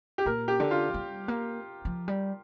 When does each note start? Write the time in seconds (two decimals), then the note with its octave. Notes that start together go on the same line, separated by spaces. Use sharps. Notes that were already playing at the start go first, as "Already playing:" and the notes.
0.18 G4
0.26 A#2 A#4
0.48 G4
0.60 D3
0.71 F4
0.94 G3
1.28 A#3
1.85 F3
2.08 G3